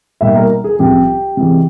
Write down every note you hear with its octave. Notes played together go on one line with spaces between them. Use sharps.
B2 G3 A#3 D#4 E5
A#4
G#4
C2 C3 F3 G4
C3 E3 G#3